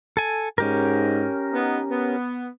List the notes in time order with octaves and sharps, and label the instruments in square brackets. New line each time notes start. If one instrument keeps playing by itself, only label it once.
[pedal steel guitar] A4 G#5
[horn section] G#2 [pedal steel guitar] C#4 G4 A#4
[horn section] B3 D#4
B3